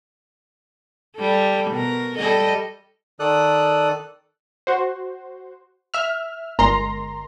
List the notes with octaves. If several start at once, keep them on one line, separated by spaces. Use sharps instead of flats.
G3 A4
B2 A#4
G3 A4 D#5
D#3 A4 D5 D#6 F#6
F#4 C5
E5 F6
G1 G#3 A#4 A#5 C6